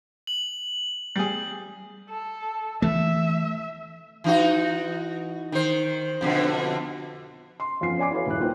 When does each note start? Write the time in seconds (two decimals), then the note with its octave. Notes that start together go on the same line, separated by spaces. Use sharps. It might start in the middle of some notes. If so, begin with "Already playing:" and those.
0.27 F#7
1.16 G3 G#4
2.09 A4
2.82 E3 A3 E5
4.24 E3 D#4 F#4
5.52 D#3 C5
6.21 F2 B2 D3
7.60 C6
7.81 F2 B3 C#4 F4 C7
7.98 C#5 D5 G#5 D6 C7
8.11 E4 F#4 A4 B4 C#5 F5
8.26 D#1 G#3 E4 C#5 F#6
8.40 A#3 D#4 F4 B4 C5 G5